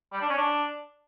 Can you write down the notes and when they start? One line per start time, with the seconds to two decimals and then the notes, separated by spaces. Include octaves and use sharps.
0.13 G3
0.21 D4
0.29 C#4
0.38 D4